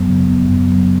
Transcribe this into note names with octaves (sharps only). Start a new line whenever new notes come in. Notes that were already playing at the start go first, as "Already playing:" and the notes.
Already playing: F#2 F#3 B3
C#3
B3
F#2
F#3